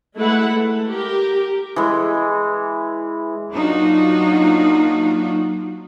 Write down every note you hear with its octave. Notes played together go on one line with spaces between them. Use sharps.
G#3 A3 E4 B4 F#5
A3
G4 A#4
E3 G#3
F#3 A#3 D4 D#4 F4 F#4